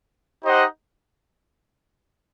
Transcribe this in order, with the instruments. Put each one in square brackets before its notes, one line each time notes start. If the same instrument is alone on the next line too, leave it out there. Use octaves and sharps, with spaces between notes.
[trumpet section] D#4 G4 C5 D#5 F#5